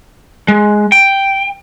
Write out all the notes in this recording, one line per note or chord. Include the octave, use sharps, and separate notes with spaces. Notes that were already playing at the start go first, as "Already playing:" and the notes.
G#3
G5